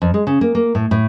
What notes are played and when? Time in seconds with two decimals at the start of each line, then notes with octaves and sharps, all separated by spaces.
0.02 F2
0.14 G#3
0.27 C#3
0.41 A#3
0.55 A#3
0.75 A2
0.91 A2